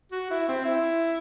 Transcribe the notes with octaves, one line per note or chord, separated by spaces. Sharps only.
F#4
E4
C4
E4